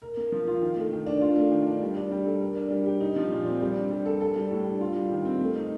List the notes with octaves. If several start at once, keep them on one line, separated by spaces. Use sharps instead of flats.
A#4
A#3
F3
F4
D#3
A3
D#3
D4
F4
A3
D#3
D4
G3
D4
G3
A4
A#4
D4
G3
G4
D#4
F3
A#2
C4
G3
D4
G3
A4
A4
G3
A2
D4
F4
G3
D#3
C4
A3
D#4